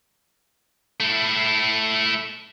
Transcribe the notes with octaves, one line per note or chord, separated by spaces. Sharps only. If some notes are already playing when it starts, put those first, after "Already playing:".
A3 E4